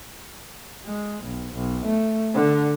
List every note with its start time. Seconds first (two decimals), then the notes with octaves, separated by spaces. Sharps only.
0.86 G#3
1.24 B1
1.53 B1
1.84 A3
2.35 D3